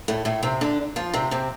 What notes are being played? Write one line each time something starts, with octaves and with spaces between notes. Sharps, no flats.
A2 A3
A2 A3
C3 C4
D3 D4
F3 F4
C3 C4
C3 C4